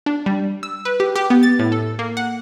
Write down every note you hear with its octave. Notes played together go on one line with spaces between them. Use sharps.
D4
G3
E6
B4
G4
G4
B3
A6
A2
A4
A#3
F#5